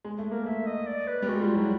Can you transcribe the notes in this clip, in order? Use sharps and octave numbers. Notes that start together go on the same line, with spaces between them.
G#3
A3
A#3 A#4
A3 E5
D#5
D5
B4
G3
G#3 F#4
G#3 F4
F#3 E4